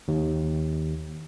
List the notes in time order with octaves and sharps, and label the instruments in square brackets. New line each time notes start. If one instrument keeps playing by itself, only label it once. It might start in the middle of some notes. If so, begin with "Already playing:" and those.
[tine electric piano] D#2